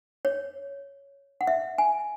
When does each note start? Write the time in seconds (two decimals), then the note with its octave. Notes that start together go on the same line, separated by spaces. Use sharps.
0.25 C#5
1.41 F#5
1.47 E5
1.78 G#5